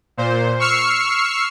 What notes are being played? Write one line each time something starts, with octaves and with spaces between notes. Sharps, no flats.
A#2 C5
C#6 E6 F6 C7 C#7